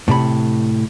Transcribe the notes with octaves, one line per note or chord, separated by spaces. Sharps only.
A2 C3 D5 B5